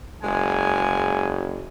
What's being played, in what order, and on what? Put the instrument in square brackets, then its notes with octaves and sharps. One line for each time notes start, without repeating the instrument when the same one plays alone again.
[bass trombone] F#1 [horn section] G#3 G#5